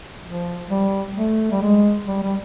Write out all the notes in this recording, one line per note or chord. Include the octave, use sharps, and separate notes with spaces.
F3
G3
A3
G3
G#3
G3
G3